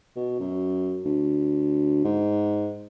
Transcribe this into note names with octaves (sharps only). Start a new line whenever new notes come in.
B2
F#2
D2
G#2